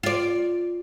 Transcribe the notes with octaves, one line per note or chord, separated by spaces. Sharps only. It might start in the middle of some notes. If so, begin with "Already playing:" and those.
F4 D5